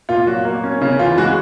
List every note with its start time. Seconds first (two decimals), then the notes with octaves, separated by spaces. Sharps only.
0.09 A#2 F4
0.27 F#3 F#4
0.45 A#3
0.64 C#4
0.81 C#3
0.99 E3 F4
1.18 G#3 F#4